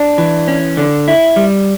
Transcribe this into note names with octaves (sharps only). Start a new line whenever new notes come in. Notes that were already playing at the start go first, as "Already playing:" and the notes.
Already playing: D4
E3
C#4
D3
E4
G3